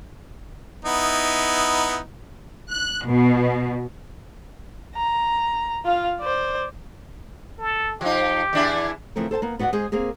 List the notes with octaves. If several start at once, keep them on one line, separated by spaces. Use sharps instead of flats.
B3 D#4 E4
F#6
B2
A#5
F4 F5
C5 D5
A4
F3 D#4 G4
E2 D4 E4
C#3 E3 F3 A3 C4 A#4
A4 C5 G#5 A5
A#3 B3
B3 F#4 D5 F5 F#5
G#3 G#4 C5 G#5
A#3 C4 G#4 A#4